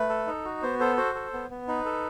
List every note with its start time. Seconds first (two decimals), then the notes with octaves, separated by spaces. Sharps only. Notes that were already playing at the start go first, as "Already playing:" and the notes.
Already playing: A3 B4
0.09 A4
0.27 D#4
0.45 F#4
0.62 B3 C5
0.80 A4 C5
0.97 F#4 C5
1.15 A4
1.33 B3
1.51 B3
1.68 D#4 B4
1.85 A4